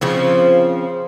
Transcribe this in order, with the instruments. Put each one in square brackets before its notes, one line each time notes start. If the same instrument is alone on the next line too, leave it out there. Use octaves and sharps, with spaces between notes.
[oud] C#3 F3 C4